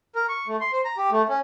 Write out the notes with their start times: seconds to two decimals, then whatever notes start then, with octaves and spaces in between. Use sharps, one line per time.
0.15 A#4
0.29 C#6
0.47 A3
0.61 C6
0.73 C5
0.85 A#5
0.97 G4
1.11 A3
1.29 C#4